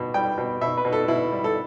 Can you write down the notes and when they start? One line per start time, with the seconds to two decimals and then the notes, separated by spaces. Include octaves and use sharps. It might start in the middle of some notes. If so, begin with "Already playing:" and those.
Already playing: B2 G3
0.14 G3 G5
0.38 B2
0.61 B2 E5
0.77 B4
0.85 B2
0.93 A4
1.08 B2 E4
1.32 G3
1.44 A4